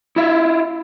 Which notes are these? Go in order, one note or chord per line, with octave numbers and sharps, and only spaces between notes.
E4 F4 E5